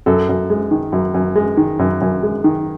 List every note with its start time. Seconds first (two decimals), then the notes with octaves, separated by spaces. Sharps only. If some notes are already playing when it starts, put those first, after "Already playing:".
0.06 F#2 A4
0.29 F#2
0.50 G#3
0.71 D#3
0.92 F#2
1.14 F#2
1.36 G#3
1.57 D#3
1.79 F#2
2.01 F#2
2.23 G#3
2.44 D#3